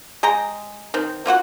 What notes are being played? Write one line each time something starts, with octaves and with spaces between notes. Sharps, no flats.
G#3 G#4 G5 A#5
D#3 C4
A#3 F4 F#4 F#5